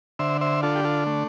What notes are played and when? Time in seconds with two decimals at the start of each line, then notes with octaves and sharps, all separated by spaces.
0.19 D3 C5 E5
0.41 C5 E5
0.63 D4 F4 A4
0.76 G4
0.84 F4 A4
1.06 A3